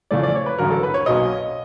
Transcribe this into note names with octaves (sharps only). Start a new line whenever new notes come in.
F2 C#3 E3 A3 D5
D5
C#5
B4
A1 G2 D3 F#3 A#4
A4
B4
C#5
B1 B2 F#3 A#3 C#4 D#5